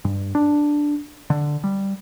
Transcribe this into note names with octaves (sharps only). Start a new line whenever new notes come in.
G2
D4
D3
G3